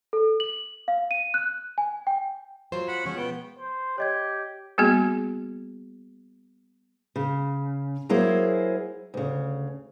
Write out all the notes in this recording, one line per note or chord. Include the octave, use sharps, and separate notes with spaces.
A4
F#7
F5
D#7
F#6
G#5
G5
F#3 F4 C5
F#5 B5
B2 F3 G#3 C#4
B3 G5
C5
G4 C#5 D#5 G#6
G3 A#3 B3 F#4 G#4
C#3
F#3 A#3 E4 G#4 C5
D2 C#3